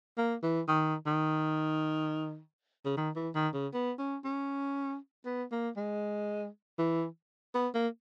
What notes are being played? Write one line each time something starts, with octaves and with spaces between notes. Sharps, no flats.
A#3
E3
D#3
D#3
C#3
D#3
E3
D#3
C#3
B3
C#4
C#4
B3
A#3
G#3
E3
B3
A#3